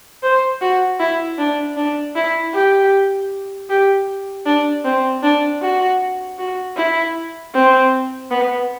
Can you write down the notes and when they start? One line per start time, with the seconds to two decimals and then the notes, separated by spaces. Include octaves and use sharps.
0.23 C5
0.61 F#4
1.00 E4
1.38 D4
1.77 D4
2.16 E4
2.54 G4
3.70 G4
4.46 D4
4.84 C4
5.23 D4
5.62 F#4
6.39 F#4
6.77 E4
7.54 C4
8.31 B3